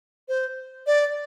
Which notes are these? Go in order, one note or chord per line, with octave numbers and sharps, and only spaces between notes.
C5
D5